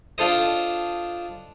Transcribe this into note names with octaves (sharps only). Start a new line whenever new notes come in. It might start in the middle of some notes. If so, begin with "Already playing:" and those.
D4 F4 A4 C5 D#5